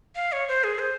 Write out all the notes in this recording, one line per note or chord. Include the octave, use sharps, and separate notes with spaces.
F5
C#5
C5
G#4
C5